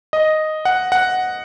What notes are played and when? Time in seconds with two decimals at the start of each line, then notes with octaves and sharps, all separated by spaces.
0.13 D#5
0.65 F#5
0.92 F#5